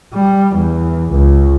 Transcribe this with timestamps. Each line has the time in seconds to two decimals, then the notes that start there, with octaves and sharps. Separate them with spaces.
0.14 G3
0.56 E2
1.12 C#2